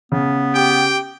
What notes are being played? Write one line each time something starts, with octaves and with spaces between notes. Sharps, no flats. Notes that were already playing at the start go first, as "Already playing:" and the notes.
C#3 B3
G4 G5